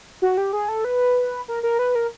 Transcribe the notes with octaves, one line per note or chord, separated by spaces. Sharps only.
F#4
G4
G#4
A4
B4
A#4
A#4
B4
A#4